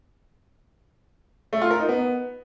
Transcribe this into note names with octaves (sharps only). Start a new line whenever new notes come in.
A3
F4
A#4
D#4
B3